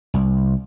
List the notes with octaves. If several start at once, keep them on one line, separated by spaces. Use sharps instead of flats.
C2